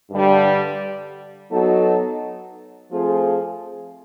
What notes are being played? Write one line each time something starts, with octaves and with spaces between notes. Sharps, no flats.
G2 D3 G3
F#3 B3 D#4 F#4 A4
F3 A3 C4 F4 G#4